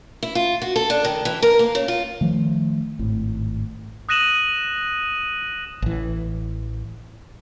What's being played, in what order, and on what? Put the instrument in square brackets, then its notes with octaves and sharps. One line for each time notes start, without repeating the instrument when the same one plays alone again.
[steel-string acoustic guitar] E4
F4
F#4
A4
D4
D#3
E3
A#4
A#3
C#3
F4
[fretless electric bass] D#3 F3 A3
G#1 A2
[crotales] D#6 F#6 A#6 D#7 E7 F#7
[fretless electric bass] A1 E3